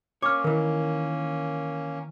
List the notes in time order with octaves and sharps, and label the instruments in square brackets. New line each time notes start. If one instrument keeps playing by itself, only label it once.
[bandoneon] A#3 C#4 [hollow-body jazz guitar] C#5 [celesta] D6 F6
[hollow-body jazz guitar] D#3 E3 [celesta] A#4